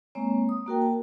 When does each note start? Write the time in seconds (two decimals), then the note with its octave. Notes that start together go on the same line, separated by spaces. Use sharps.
0.15 G#3 A#3 C4 C#5
0.49 D#6
0.66 A#3 F#4 A#4 G5
0.82 A5